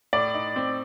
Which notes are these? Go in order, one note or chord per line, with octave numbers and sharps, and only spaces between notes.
A2 D5
D#4
C4